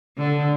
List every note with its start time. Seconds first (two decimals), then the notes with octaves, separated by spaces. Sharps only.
0.18 D3